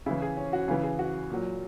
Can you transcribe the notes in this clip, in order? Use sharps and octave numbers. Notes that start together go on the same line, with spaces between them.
C#3 E3 E4
G#4
C#4
F#4
C#3 E3 G#4
G#4
F#4
A#2 F#3